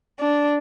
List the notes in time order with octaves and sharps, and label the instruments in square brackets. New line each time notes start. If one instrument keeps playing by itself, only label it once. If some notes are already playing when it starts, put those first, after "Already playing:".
[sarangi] D4